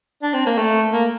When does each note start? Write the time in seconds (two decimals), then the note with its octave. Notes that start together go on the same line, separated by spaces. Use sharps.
0.23 D4
0.34 C4
0.46 A#3
0.58 A3
0.93 A#3